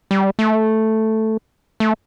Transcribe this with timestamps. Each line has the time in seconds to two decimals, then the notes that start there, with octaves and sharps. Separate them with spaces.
0.11 G3
0.39 A3
1.80 A3